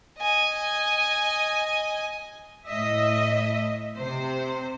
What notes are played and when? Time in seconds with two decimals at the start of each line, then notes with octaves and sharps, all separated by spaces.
0.19 D#5 G#5
2.66 A2 D#5 E5
3.96 C3 C5